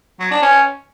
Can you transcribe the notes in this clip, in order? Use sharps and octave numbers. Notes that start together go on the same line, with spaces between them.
F#3
D4
C#4